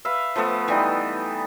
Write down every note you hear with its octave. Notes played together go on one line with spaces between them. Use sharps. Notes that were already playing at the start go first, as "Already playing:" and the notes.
B4 E5 F5
F3 A3 B3 A4
E3 G3 D#4